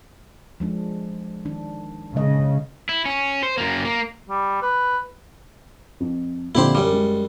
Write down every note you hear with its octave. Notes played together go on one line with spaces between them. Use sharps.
F3 G#3 D4
D#3 D4
C#3 G#3 D#5
E4
C#4
C5
F#2 A#3
A#3
G3
B4
F2
F2 A#2 D3 E4 G4 C5
F#2 G3 A#4 D6
G#3